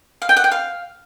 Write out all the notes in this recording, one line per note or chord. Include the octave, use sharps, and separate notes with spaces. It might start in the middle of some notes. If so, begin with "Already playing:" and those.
F5
G5
F#5
G5
F5